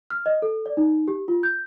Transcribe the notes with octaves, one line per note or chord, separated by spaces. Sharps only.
F6
D#5
A4
D5
D#4
G4
F4
G6